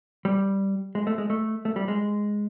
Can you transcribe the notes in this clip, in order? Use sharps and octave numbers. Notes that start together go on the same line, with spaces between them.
G3
G#3
A3
G#3
A3
A3
G3
G#3